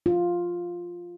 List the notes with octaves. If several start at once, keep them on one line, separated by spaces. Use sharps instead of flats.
F4